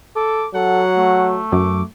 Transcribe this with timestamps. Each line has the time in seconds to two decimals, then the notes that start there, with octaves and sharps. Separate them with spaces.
0.16 A4 D6
0.55 F#3 A4 F#5
0.97 A3
1.52 F#2 D6